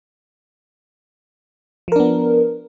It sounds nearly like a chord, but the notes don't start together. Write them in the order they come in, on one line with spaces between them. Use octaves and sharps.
F3 A#4 D4 B3